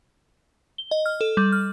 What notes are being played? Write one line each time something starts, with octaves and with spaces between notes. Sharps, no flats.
G7
D#5
F6
A4
G3
F6